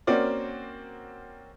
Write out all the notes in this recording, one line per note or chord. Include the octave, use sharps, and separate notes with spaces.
A#3 C4 C#4 F#4 A#4 D5